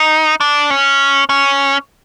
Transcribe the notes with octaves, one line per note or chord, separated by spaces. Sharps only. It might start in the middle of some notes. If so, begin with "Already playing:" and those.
Already playing: D#4
D4
C#4
C#4